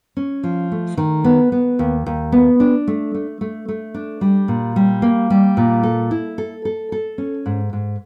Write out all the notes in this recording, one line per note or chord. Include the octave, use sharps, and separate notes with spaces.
C#4
F3
A3
D#3
B3
B3
D#2
D#2
B3
D4
A3
A3
A3
A3
D4
G3
A#2
G3
A#3
G3
A#2
A4
E4
A4
A4
A4
C#4
G#2
G#2